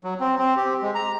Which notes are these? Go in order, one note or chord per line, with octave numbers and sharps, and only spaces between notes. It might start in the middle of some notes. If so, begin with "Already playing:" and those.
F#3
C4
C4
G4
G#3
A#5